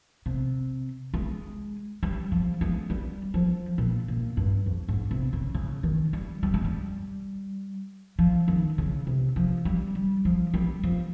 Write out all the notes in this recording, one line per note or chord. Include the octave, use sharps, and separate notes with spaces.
C3
G#3
G3
F3
G#3
G3
F3
A#2
A#2
G2
F2
G#2
C3
C#3
C#3
D#3
G3
G3
G#3
G3
F3
D#3
C#3
C3
F3
G3
G3
F3
G3
F3